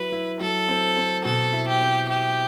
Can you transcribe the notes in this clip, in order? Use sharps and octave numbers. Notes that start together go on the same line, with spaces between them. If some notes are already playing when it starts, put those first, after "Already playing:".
Already playing: F#3 E4 B4
E4
F#3 A4
C4
C4
B2 A4
E4
G4
C4
E4 G4